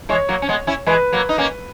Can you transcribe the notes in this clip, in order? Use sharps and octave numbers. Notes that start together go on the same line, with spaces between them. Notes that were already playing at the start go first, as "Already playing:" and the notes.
E3 G#3 C#5
F#3 A#3
C#4
G#3 B3
C#4 E4
E3 G#3 B4
F#3 A#3
D#4
A#3 C#4